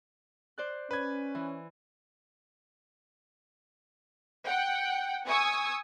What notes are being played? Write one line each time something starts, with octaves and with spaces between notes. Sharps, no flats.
C5 D5 F#6
C#4 B4 G#6
E3
F#5 G5
G#5 C#6 D#6 E6 G#6